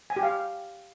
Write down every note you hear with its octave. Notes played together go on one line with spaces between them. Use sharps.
G#5
G4
F5